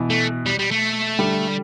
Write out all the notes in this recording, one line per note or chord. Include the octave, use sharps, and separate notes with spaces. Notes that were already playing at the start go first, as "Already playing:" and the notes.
Already playing: B2 E3
A3
G3
G3
A3
D3 G3
G3